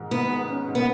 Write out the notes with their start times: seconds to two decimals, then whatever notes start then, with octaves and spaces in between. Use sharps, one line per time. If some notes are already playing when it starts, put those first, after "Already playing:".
Already playing: G#2 D#3 G#3
0.11 G#2 B3
0.30 G#3
0.48 C#4
0.68 G#2
0.75 B3